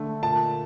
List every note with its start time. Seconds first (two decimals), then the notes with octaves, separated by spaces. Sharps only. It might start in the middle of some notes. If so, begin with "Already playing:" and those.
Already playing: D3 A3
0.23 A#2 A5